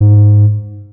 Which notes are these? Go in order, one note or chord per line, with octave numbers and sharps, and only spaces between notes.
G#2